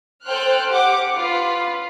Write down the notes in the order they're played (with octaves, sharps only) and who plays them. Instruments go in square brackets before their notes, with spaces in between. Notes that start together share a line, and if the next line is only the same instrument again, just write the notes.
[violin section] A4 C5 G5 F6 F#6
G4 F#5 D6
F4 B4